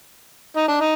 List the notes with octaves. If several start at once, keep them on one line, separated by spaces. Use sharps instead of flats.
D#4
D4
D#4